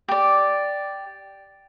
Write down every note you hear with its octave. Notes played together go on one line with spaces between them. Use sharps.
G4 D5